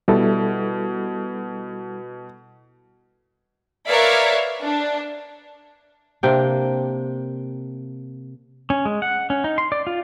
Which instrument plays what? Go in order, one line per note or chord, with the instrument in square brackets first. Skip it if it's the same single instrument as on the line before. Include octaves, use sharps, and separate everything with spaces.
[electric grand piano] B2 [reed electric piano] G3 E4 A4
[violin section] A#4 B4 C#5 D5 E5 F5
D4
[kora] C3 A#3 D4 G5
[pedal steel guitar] C#4
G#3
F#5
C#4
D#4
C6
D5
F4